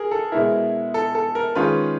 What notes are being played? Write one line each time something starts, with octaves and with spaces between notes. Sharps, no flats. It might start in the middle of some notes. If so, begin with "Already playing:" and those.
Already playing: G#4 A#4
A4
B2 G#3 B3 E4 A#4
A4
A4
A#4
D#3 G#3 C#4 F4 B4